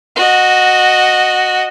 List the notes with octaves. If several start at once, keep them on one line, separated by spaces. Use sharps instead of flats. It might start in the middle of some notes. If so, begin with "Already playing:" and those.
F#4 D#5